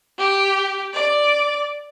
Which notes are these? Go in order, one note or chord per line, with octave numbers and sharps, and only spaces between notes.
G4
D5